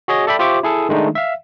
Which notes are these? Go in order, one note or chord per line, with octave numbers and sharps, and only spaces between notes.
F#4 G#4 C#5 D#5
A4 D5 E5 G5 B5
F4 G4 C5 E5 C#6 D6
E4 G#4 A4
D#3 G#3 A3 D4 D#4
E5 F5